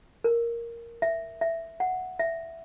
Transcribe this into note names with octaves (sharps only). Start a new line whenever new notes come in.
A#4
E5
E5
F#5
E5